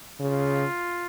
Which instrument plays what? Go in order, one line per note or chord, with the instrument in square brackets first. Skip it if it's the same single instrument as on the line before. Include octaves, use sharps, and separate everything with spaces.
[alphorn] C#3 [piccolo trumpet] F4